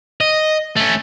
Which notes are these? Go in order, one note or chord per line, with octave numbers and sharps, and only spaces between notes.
D#5
A3 C#4